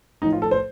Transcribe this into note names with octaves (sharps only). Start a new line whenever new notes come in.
A2 F3 D#4
F4
A4
C5